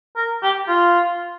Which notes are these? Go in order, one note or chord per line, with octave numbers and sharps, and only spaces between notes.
A#4
G4
F4